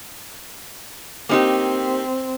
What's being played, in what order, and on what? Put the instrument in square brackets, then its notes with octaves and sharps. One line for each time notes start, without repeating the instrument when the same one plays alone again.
[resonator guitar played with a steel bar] A#3 D#4 G4 [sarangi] C4